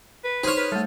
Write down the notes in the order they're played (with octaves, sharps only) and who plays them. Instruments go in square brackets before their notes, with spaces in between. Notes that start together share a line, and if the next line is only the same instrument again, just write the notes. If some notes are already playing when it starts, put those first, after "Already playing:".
[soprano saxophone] B4
[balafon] D#4 C6 C#6 [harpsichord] G#4 C#5 [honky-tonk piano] C5 F6
[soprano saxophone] B4
[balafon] G3 A3 [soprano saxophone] A4